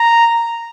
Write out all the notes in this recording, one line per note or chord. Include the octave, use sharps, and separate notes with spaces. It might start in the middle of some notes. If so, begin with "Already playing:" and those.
Already playing: A#5